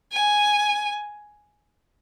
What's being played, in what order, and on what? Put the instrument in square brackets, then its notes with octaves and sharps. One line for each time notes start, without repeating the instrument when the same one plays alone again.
[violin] G#5